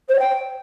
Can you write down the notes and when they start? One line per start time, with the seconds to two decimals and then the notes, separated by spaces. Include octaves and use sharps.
0.08 C5
0.13 C#5
0.18 G5